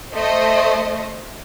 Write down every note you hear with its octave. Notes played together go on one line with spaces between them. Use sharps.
A3 C5 D#5